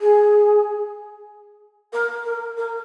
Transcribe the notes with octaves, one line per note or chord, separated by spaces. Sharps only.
G#4
A#4
A#4
A#4